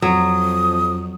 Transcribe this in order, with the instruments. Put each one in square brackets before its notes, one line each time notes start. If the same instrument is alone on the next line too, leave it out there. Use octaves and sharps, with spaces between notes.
[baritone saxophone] F2 [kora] F#3 [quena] D#6